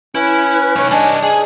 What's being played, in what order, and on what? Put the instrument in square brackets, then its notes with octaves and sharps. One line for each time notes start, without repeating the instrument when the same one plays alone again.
[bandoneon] C#4 [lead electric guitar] E4 [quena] B4
[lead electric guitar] D#4 B4 [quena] C#5
[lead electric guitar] G3 D#5 [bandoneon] D4 [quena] G#5
[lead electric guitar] G#4 [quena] G#5